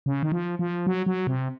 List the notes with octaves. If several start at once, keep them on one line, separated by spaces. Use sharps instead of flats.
C#3
D#3
F3
F3
F#3
F#3
C3